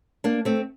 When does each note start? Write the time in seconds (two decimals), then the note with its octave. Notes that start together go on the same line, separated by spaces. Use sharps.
0.24 A#3 D4
0.45 A3 C4